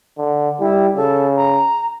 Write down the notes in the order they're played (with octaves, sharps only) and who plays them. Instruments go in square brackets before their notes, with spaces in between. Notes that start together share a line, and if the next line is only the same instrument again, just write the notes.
[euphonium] D3
[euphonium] G3 [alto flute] E4
[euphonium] C#3 [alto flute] A4
[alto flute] A#5